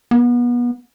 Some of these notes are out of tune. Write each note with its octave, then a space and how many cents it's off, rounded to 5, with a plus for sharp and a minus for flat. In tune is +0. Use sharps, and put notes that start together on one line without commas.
B3 -30